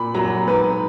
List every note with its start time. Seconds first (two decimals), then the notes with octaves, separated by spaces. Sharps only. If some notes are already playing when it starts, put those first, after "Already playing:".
Already playing: A#2 B5
0.14 F#3 A#5
0.47 G#2 B4